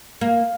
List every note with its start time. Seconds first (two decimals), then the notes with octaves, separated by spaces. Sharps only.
0.21 A#3